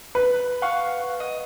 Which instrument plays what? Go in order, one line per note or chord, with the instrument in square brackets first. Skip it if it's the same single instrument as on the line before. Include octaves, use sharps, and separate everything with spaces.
[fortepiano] B4
[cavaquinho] F5 F#5 C#6
D#5